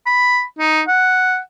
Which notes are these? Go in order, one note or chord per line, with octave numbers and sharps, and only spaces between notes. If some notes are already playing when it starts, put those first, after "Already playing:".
B5
D#4
F#5